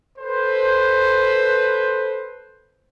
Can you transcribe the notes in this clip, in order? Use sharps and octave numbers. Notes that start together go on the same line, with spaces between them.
A4 B4 C5